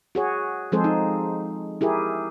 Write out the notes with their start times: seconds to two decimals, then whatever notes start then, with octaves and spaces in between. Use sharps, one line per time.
0.15 F#4 G#4 C#5
0.72 F3 G#3 C4 G#4 A4 C5
0.84 D#4
1.81 E4 G4 G#4 A#4